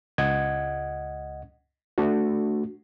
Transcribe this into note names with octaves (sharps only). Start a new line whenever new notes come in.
C#2 D#5 F#5 G#6
A3 D4 F#4